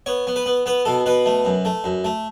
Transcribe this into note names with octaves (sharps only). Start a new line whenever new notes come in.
B3 C#5
B3
B4
B3
B3 B4
B2 A4
B2 B4
A3
F#2
A3
F#2
A3